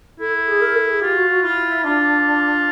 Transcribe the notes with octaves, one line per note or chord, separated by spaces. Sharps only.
E4 A4
A4
G#4
A#4
A4
G#4
F4 G4
F#4
F#4
E4 F4
D4 F4